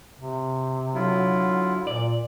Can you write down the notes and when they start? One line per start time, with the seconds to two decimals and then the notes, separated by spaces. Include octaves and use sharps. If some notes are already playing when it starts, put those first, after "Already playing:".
0.19 C3
0.95 D3 F#3 E4 F4
1.87 A#2 D5